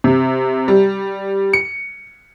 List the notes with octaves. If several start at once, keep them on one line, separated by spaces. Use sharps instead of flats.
C3
G3
C#7